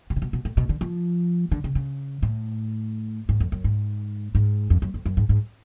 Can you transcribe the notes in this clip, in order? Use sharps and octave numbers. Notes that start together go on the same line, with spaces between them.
B2
C#3
B2
B2
A2
B2
D3
F3
D3
C#3
C#3
A2
G#2
F2
F#2
G#2
G#2
F2
F#2
F2
F#2
G#2
G#2